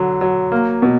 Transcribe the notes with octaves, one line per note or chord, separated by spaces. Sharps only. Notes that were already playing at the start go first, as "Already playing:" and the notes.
Already playing: D3 F#3
F#3
A#3
B2